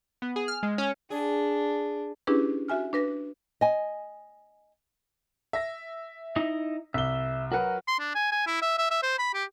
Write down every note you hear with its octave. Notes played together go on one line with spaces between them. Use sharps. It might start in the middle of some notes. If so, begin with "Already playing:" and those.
B3
G#4
F6
G#3
C#4
D4 G#4
C#4 D4 E4 G4 G#4 B4
F#4 E5 G#5 F6
D4 B4 A#6
D#5 G#5
E5 A#6
D#4 E4 D#5
C2 E5 G7
F#3 F#4 A#4 B4 F#5
C6
D4
G#5
G#5
E4
E5
E5
E5
C5
B5
G4